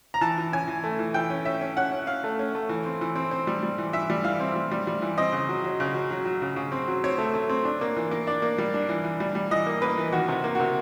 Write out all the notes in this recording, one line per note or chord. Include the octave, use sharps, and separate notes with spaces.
A#5
E3 A5
E3
C#4 G#5
E3
A3
E3
E3 G5
C#4
C#4 E5
C#4
C#4 F#5
C#4
C#4 F5
A3
C#4
A3
E3
C4
E3
C4
C4
G3
G3
E3
E3 E5
G3
E3 F5
C4
G3
G3
G3
E3
C4 D#5
C#3
F#3
F#3
C#3
F#3
F#3
F#3
C#3
C#3
C4
F#3
C4 C#5
A3
A3
C4
D4
A#3
E3
A#3
D4 D5
A#3
G3
D4
E3
E3
G3
G3
E3 D#5
A#3
A#3 B4
E3
D#3 F#4
C3
A#3
C3 F#4